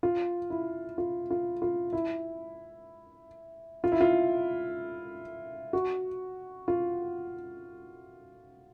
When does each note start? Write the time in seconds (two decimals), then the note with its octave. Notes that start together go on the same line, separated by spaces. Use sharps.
0.03 F4
0.50 E4
0.98 F4
1.31 F4
1.62 F4
1.93 E4
3.84 F4
3.92 E4
4.01 F4
5.73 F#4
6.68 F4